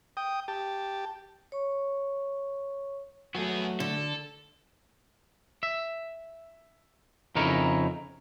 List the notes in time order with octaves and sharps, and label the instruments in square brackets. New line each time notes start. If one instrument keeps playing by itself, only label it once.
[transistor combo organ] G5 D#6
G4 A5
[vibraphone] C#5 C#6
[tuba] F#3 [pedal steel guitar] A3 F#4 [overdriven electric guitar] B3 G#4
[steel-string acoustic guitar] D3 [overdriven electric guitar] A4
[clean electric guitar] E5
F2 C#3 D#4 E4 A#4 C#5